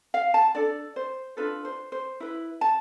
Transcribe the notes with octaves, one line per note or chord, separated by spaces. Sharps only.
F5
A5
D4 A4 D5
C5
D4 F4 A4 B4
C5
C5
E4 B4
A5